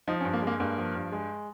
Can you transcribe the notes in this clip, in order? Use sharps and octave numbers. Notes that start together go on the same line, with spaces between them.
F3 D#4
C#4
G2
A#3
G#3
A#3
G2 A#3
F3
G2
G#3